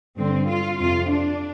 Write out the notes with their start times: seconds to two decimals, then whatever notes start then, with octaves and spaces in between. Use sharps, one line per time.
0.17 G2 D3 C4
0.48 F4
0.79 F2 C3 F4
1.09 D4